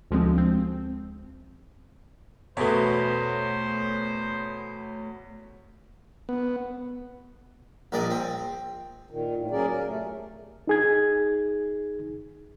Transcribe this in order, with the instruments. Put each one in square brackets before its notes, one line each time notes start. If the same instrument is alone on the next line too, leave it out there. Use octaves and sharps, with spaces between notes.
[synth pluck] D2 F3 G#3 C4
C4
[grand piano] E2 B2 B3 [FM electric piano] A3 C#5 [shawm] C5
[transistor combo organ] B3
[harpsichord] A#1 A#2 A#3 D5 D#5
C4
[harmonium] A#2 D#3
A2
F#3 A#3 C#4 G#4 A#4 D5
A#4
C3 A3
[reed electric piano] D#4 G#4 G#6